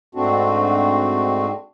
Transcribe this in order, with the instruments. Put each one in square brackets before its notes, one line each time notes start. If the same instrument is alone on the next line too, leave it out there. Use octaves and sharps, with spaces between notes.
[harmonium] G#2 A3 C4 D4 F#4